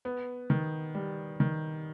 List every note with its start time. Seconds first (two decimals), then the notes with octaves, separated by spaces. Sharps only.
0.05 B3
0.50 D#3
0.95 G3
1.40 D#3